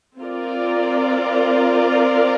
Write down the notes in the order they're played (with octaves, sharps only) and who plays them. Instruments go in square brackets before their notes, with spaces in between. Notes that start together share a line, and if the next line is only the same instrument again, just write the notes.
[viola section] C4 F4 A#4 D5